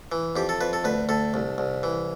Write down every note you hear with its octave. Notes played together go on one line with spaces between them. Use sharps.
E3
F2 G4
A4
F2 B4
A4
D2 B4
D2 A4
C2
C2
E3